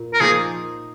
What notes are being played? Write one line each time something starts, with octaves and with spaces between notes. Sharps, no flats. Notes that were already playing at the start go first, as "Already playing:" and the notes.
Already playing: A#2
A#4
F3 A#3 D#4 G#4